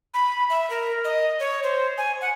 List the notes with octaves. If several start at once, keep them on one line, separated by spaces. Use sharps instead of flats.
B5
E5
A#4
D#5
C#5
C5
G#5
F#5